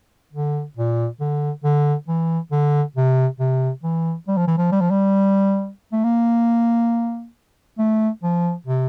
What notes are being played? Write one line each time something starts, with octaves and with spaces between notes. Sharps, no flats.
D3
A#2
D3
D3
E3
D3
C3
C3
E3
G3
F3
E3
F3
G3
F3
G3
A3
A#3
A3
F3
C3